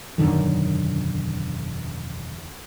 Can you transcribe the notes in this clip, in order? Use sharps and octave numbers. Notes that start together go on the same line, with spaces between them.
E1 F#2 D3 D#3